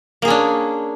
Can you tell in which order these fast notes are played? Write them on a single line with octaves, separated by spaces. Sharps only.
A#3 G#4 C#4 D4